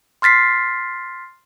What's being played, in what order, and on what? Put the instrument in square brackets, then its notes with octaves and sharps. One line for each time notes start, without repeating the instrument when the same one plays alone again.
[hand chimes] C6 F6 A6 B6 C7